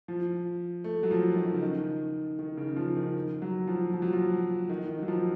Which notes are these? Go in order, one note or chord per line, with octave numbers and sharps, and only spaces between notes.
F3
A3
F#3
F3
D#3
C#3
D#3
D#3
C#3
F3
D#3
F#3
F3
F3
F#3
F3
D#3
D#3
F#3
F3